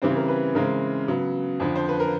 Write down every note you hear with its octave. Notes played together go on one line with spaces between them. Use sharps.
C#3 E3 G3 C4 C5
A#4
B4
C#3 E3 G#3 C4 A#4
C#3 F#3 B3
F2 D3 F3
C5
B4
A#4